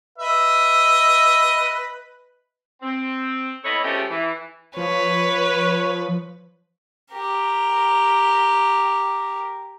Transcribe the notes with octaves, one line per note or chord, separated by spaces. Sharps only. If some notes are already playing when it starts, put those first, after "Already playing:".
B4 D#5 E5
C4
B3 E4 A4 B4 C#5 D#5
F3 G#3 A3 C#4 G4
E3
F3 B4 C#5
G4 A#4